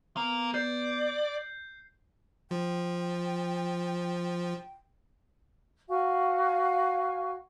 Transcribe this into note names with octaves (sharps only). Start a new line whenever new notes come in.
A#3 B3
D5 G6 C7
F3 G5
F#4 F5 G#5